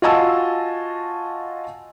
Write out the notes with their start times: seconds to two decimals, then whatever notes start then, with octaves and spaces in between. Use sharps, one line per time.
0.02 F4 F#4 D#5 G#5 A5 E6